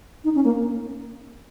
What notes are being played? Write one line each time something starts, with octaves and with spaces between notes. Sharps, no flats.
D#4
C#4
A#3